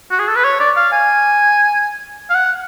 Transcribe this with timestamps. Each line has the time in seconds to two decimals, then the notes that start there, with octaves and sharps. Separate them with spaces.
0.11 F#4
0.19 G#4
0.28 A4
0.35 B4
0.44 C#5
0.60 D5
0.77 F5
0.92 G#5
2.30 F5
2.34 F#5